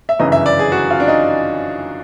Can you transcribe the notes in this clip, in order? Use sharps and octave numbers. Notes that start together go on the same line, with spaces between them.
E5
G1 F#2 C#3 E3 D#5
E5
D5
G#4
F#4
F4
D4
D#4